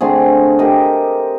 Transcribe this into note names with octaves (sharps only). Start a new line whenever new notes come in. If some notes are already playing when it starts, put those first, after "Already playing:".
D3 A3 C4 G#4
G4 A#4 D#5